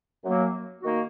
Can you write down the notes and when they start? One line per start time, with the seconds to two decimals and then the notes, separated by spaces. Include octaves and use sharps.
0.24 F#2 F#3 A#3
0.81 D#3 A#3 D#4 F#4